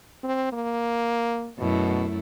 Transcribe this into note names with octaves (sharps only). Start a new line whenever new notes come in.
C4
A#3
F#2 B2 A3 E4